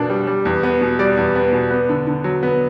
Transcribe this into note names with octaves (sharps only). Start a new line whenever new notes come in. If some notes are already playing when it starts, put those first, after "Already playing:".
Already playing: B2 A#3 D4
G3
G3
E2
B3
B2
G3 D5
E2
B3
B2
B3
D3
D3
F#3
B3